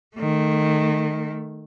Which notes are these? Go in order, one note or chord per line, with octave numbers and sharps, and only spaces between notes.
D#3 A3